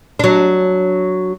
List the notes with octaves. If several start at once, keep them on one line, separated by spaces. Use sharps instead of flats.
F#3 D4